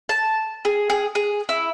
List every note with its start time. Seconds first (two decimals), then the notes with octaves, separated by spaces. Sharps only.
0.09 A5
0.65 G#4
0.90 G#4
1.15 G#4
1.49 E4